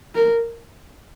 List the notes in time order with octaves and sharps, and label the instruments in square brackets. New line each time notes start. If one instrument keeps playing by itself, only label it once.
[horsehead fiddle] A#4